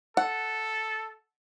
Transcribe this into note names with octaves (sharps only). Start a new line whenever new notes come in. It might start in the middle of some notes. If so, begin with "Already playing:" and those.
A4 F#5